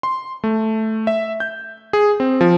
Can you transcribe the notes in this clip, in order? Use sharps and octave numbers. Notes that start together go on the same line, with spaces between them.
C6
A3
E5
G6
G#4
C4
F3